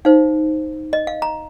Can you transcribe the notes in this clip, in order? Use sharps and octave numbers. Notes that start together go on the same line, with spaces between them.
D#4 C5 F5
D#5
F5
A#5